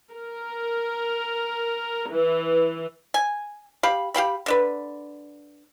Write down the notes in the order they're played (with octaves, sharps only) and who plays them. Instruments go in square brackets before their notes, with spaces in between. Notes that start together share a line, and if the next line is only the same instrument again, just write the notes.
[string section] A#4
E3
[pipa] G#5
G4 F5 B5
G4 F5 G5 B5
D3 D4 B4